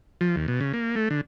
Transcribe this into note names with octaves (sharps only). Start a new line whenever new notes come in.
F3
D#2
B2
C#3
A#3
A3
D3